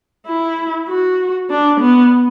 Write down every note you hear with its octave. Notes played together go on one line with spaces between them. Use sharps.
E4
F#4
D4
B3